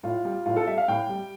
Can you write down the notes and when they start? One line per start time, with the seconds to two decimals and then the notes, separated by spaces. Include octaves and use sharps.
0.03 A2 F4
0.25 G3
0.46 A2 F4
0.56 A4
0.67 G3 E5
0.78 F5
0.88 A2 G5
1.09 G3